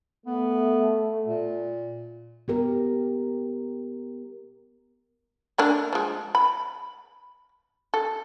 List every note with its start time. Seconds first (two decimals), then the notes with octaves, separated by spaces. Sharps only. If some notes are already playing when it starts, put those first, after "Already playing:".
0.26 A3 B3
1.26 A#2
2.48 B3 G4 A#4
5.58 A3 A#3 D4
5.93 F3 G#3
6.35 B5
7.94 A4